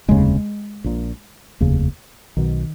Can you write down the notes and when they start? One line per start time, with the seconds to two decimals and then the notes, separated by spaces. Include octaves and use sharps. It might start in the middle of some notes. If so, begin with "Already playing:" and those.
0.08 F1 D#2 C#3 G#3
0.84 A#1 A#2
1.60 F1 D#2 C#3
2.36 B1 B2 D#3